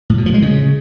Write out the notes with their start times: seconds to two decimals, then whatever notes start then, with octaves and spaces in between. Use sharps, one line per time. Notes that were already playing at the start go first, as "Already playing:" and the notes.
0.10 A2
0.18 B2
0.26 F3
0.34 G#3
0.42 C#3